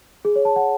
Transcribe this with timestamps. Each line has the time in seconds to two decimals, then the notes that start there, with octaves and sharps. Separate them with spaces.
0.25 G#4
0.36 C#5
0.45 A5
0.56 F#5